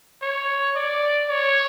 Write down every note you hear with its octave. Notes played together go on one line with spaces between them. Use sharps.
C#5
D5
C#5